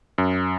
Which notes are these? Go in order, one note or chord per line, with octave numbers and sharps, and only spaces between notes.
F#2